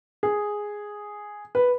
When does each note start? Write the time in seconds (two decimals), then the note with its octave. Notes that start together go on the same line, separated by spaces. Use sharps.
0.23 G#4
1.55 B4